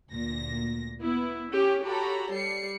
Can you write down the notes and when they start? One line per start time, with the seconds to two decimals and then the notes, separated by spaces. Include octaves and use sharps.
0.12 D2 A#2 A#6
1.00 B3 E4
1.52 C#4 G4
1.86 F#4 G4 A4 C#5 A#5 B5
2.32 G3 C7 C#7